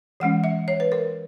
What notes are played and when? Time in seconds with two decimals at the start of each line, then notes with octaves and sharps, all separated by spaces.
0.20 E3 G#3 C#4 F#5
0.44 E5
0.68 C#5
0.80 B4
0.92 A#4